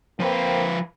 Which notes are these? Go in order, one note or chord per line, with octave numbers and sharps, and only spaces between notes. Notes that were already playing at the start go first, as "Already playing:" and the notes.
F3 A#3 C4 B4